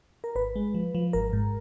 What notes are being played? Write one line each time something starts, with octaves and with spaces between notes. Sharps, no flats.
A#4
G#1 B4
G#3
F3
F3
G#1 A#4
G#2